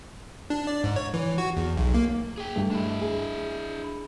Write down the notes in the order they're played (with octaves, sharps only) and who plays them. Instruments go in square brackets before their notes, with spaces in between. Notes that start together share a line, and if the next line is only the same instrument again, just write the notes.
[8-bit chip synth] D4
D5
G#2
C#5
E3
F#4
E2
B1
A#3
[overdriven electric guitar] G#4 G5
[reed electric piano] G2 A3
[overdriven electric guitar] D4 E4
[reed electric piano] G#4